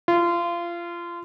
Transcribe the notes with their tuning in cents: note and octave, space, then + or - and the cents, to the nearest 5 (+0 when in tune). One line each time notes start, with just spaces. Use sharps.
F4 -25